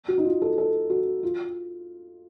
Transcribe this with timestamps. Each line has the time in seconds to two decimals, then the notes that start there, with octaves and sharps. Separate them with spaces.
0.08 F#4
0.18 D#4
0.24 F4
0.42 A4
0.58 A4
0.90 F#4
1.23 F4